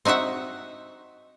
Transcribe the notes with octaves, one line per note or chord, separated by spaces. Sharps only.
C4 D#4 F#4 E5 F#5